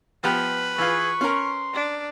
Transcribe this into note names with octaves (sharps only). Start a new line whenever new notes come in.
F3 B3 G4 B4
E3 F4 G#4 C#6
C#4 A#4 C6
D4